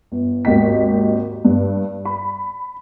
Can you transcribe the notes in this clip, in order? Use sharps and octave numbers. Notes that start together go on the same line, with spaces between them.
G1
G#1 D#2 D#5 G5 B6
G2
B5